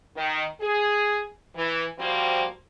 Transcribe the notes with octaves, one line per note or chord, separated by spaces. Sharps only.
D#3
G#4
E3
F3 G3 A#3 C4 F#4